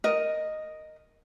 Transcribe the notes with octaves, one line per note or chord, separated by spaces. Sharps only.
A#4 D#5